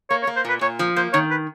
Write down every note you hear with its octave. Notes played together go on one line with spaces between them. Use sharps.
A#3 C#5
C#5
A#3
C5
A#2 B4
A#2 C#5
F3
A#3 C5
D#3 C#5
B4